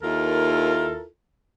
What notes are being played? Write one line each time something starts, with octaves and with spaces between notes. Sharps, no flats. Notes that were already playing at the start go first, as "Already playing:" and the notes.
D#2 E4 F4 A4 A#4